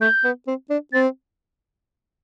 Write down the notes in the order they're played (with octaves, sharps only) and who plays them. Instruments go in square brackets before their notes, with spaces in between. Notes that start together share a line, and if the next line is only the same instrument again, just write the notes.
[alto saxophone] A3 [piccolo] G6
[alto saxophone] B3
C4
D4
[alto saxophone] C4 [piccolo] A6